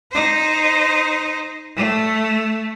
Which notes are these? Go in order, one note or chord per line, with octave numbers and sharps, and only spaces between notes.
D#4 C5
A3